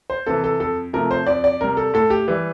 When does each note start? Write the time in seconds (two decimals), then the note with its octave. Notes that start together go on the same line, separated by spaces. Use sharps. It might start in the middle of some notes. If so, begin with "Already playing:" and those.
0.10 C5
0.26 C3 E3 A4
0.44 A4
0.60 F2 A4
0.93 C3 F3 A3 A#4
1.11 C5
1.26 F2 D5
1.44 D5
1.61 C3 G3 A#4
1.77 A4
1.94 A2 A4
2.10 G4
2.28 E3 G3